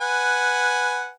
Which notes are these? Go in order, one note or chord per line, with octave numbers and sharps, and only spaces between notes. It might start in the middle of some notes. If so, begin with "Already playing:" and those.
B4 F#5 G#5